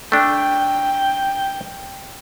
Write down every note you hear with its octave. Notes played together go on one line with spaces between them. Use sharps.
A3 D4 G5